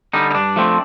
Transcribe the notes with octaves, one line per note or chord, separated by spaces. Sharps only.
D3 G3 D#4
D#4
G2 D4
F3 A3 C4